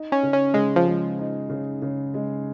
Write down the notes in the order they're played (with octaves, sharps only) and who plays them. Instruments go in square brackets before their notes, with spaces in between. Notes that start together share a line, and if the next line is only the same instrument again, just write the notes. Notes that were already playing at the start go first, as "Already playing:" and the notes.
Already playing: [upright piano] D#4
[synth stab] C#4
[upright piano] C#3
[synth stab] C#4
[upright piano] C#3 [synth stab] G#3
[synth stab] F3
[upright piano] G#3
D#4
C#3
C#3
G#3